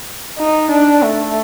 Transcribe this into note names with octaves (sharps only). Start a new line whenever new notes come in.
D#4
D4
A3